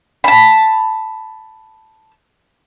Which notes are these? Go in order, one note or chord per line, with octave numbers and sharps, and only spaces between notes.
A5 B5